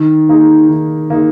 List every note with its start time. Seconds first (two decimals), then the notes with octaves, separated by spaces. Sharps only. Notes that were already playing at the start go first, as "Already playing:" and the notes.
Already playing: D#3
0.29 A#3 D#4 G#4
0.69 D#3
1.10 A#3 D#4 G#4